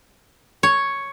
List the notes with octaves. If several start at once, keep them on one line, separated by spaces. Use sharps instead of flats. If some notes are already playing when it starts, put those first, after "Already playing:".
C#5